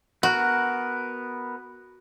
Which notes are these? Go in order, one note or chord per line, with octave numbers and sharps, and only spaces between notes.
B3 F#4 A#4 B4